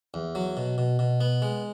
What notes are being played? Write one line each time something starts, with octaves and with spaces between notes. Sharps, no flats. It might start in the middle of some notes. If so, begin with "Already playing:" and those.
E2
F#3
B2
B2
B2
B3
G#3